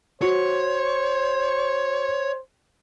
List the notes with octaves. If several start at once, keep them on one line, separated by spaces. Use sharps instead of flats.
F#4 C5 C#5